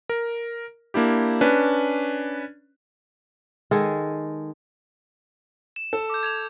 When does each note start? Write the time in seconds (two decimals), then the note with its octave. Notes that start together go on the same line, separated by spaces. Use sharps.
0.09 A#4
0.94 A#3 D4 E4 G4
1.41 C#4 D4 B4
3.71 D#3 G#3 G#4 A4
5.76 E7
5.93 A4
6.10 D6 G6
6.23 G#6 E7 F7